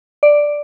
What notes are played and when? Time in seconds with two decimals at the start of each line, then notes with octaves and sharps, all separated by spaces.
0.23 D5